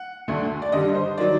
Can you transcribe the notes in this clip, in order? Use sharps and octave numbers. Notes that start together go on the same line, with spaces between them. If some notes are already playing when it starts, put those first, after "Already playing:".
Already playing: F#5
D2 D3 A3
D5
G2 D3 G3 D#5
C5
D#3 F#3 D5